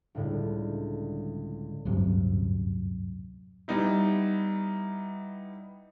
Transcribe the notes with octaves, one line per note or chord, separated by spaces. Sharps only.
C#2 A2 D3 G3
D1 G1 F#2 C3
G3 B3 D#4 E4